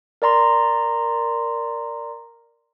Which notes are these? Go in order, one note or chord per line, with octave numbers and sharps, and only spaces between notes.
A#4 D5 A#5 C6